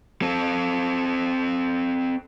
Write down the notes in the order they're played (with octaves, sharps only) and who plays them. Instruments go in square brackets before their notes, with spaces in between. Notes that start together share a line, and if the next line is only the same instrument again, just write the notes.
[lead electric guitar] C4 A4